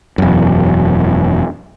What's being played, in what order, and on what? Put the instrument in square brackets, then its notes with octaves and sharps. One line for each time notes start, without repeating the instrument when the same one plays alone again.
[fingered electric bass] E1 F#2